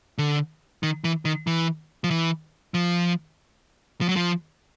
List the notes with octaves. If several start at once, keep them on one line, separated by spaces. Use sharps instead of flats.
D3
D#3
E3
D#3
E3
F3
E3
F3
F3
F#3
F3